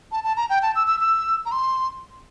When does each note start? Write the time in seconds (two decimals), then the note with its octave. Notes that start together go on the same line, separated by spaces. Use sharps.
0.12 A5
0.24 A5
0.37 A#5
0.50 G5
0.63 A5
0.75 E6
0.87 E6
1.01 E6
1.45 A#5
1.52 C6